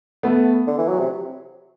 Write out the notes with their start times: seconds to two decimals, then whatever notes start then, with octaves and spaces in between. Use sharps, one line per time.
0.23 A3 B3
0.67 D3
0.78 E3
0.88 F#3
1.00 C3